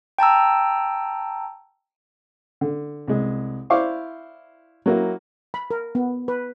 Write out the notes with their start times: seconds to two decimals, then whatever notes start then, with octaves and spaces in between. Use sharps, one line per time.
0.19 G5 A5 A#5 E6
2.61 D3
3.08 C2 G#3
3.70 E4 C5 D5 F5 C#6 D6
4.86 F#3 A#3 E4
5.54 B5
5.71 A#4
5.95 B3
6.28 B4